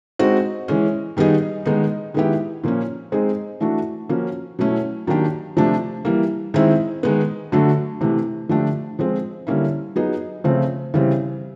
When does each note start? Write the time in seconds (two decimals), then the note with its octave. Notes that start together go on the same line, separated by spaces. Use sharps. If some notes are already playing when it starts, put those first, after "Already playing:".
0.19 G#3 C4 D#4 F#4
0.68 E3 G#3 C#4
1.17 D#3 G3 B3 D#4 G#4
1.65 D#3 G#3 B3 D#4
2.14 D#3 G#3 B3 E4 G4
2.64 A#2 F3 A#3 C#4
3.12 G#3 C4 D#4 G#4
3.60 E3 A3 D4 F#4
4.09 F3 A#3 C#4 F#4
4.59 B2 F#3 A3 C#4 E4
5.07 D#3 F#3 A#3 D4 G4
5.57 C3 F3 A3 D4
6.05 E3 G3 A#3
6.54 D#3 G#3 C4 E4
7.03 D#3 G#3 B3
7.52 D3 F#3 A3 D4 F#4
8.01 C3 E3 A3
8.49 D3 F3 A3 D4 G4
8.99 F3 G#3 C4
9.47 D3 G3 A#3 C#4 E4
9.96 F#3 B3 D#4 G#4
10.44 C#3 F3 A3 C4
10.94 C#3 E3 G3 C4